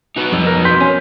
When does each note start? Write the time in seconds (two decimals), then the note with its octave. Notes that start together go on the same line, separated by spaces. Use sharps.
0.16 D#4 F#4 B4
0.32 F2
0.47 A#4
0.65 C6 G6 B6
0.81 C#4